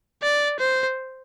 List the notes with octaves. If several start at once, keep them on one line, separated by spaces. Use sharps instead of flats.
D5
C5